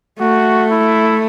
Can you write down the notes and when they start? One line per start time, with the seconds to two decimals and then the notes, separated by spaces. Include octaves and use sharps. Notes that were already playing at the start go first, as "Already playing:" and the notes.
0.20 A3 F#4
0.71 E4